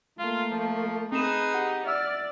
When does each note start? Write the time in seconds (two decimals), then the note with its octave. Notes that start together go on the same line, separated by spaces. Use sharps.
0.19 A3 A#3 F4
0.51 F3
1.12 C4 D#4 G#4 B4 E7
1.54 G4 F#5
1.86 D5 E5 E6 F6